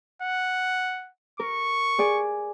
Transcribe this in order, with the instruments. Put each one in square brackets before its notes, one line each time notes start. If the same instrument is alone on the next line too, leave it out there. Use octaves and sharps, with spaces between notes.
[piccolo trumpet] F#5
[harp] A#4 [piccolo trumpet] C#6
[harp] G#4 D5 G#5